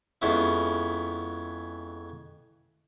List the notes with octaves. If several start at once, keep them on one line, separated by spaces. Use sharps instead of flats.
F2 G#3 B3 C#4 E4